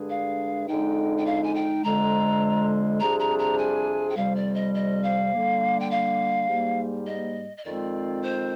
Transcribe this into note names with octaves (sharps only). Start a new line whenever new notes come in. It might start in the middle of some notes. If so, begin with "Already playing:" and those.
Already playing: G2 D3 G#3 D4 G#4
F5
F2 D3 G#3 D#4 G5
G5
F5
G#5
G5
F2 D3 G#3 A#5
F2 C3 G3 D4 G#4 A#5
A#5
A#5
G#5
G5
F2 C3 G3 F5
D5
D#5
D#5
F5
D3 G3 A#3
G5
F5
G#2 G3 A#3
D#5
D#5
F2 D#3 G#3 C4 F4 D5
C5